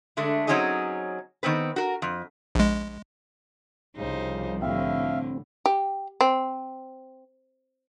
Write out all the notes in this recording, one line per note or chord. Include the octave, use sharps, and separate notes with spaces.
D3 G#3 A3 D4
F#3 C4 C#4 D#4 G#4 D#5
D#3 B3 C4 B4
F#4 A#4
F2
A#1 G#3
C2 C#3 F3 G3 D#4 C5
A2 D3 C4 E5 F5
G4
C4